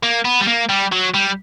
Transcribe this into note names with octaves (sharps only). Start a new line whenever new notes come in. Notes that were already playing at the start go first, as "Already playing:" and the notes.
A#3
B3
G3
A#3
G3
F#3
G3